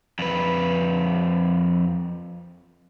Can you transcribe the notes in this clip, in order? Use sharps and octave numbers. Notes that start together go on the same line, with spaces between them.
F2 B4